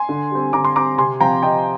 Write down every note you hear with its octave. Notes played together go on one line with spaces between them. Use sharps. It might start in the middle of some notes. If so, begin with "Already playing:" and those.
Already playing: G#5 C6
D3
G3 C4
D3 A#5 D6
C6
G3 C4 A#5 D6
C3 G#5 C6
F3 C4 G5 A#5
C3 D#5 G5